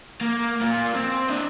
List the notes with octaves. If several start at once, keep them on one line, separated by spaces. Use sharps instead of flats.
A#3
A#3 F4
C4
D4 D#5